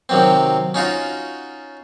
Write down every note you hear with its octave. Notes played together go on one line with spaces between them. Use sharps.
C3 D#3 F#3 C4
C#4 D#4 F4 F#4